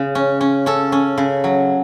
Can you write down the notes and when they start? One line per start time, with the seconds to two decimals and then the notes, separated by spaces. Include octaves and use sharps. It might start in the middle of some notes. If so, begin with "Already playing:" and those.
Already playing: C#3
0.15 C#4
0.41 C#4
0.66 C#4 A4
0.92 C#4
1.18 C#3
1.44 F#3